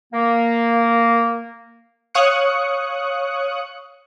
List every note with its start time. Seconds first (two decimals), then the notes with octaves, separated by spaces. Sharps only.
0.13 A#3
2.14 C#5 F5 C#6 D#6 F#6 C#7